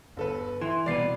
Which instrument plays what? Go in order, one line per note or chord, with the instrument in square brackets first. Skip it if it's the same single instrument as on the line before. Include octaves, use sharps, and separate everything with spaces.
[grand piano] G1 A4 B4
[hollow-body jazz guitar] E3 [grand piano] C6
[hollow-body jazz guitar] C2 B2 B4 [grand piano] D5 C7